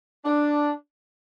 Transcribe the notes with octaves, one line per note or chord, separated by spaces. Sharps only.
D4